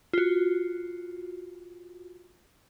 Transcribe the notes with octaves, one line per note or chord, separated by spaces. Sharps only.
F4 F#4